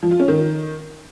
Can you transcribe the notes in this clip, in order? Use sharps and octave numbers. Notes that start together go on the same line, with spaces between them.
F3
F4
C#4
D#3